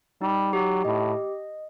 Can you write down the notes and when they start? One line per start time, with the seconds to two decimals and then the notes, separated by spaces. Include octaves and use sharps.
0.22 G3 D#4
0.53 F#3 G4
0.85 A2 D#5